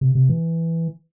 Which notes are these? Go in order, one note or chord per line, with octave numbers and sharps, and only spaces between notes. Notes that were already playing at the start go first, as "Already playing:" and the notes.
C3
C3
E3